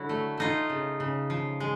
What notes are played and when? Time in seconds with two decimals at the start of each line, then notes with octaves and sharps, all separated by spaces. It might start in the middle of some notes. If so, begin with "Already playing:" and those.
Already playing: D3 F#3 E4 F#4
0.09 A3
0.37 A3 D#4 F4
0.70 C#3
1.00 C#3
1.30 F3
1.60 G#3